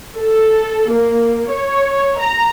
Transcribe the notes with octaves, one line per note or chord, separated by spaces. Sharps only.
A4
A#3
C#5
A#5